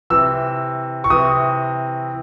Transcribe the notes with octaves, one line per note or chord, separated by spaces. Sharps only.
C3 E3 E6
C#6
C3 E3 D#6